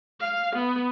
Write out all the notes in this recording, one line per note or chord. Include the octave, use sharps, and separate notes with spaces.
F5
B3